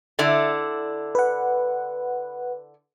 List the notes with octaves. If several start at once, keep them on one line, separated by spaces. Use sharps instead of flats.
D3 E4 D5
B4 F#5